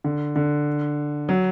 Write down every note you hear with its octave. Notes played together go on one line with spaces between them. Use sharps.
D3
D3
F#3